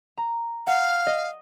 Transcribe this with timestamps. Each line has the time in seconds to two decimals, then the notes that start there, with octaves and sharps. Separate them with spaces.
0.17 A#5
0.67 F5 F#5
1.07 D#5